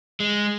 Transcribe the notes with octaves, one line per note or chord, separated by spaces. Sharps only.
G#3